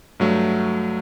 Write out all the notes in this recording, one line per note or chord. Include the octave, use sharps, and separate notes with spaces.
G2 F#3 A3